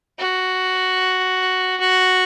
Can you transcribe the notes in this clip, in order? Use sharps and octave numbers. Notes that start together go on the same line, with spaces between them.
F#4
F#4